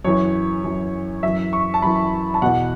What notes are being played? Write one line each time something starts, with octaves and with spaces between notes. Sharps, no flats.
F#2 E3 C#5
F#2 E3
F#2 E3 E5
C#6
A5
F#2 E3 B5
A5
E2 B2 F#5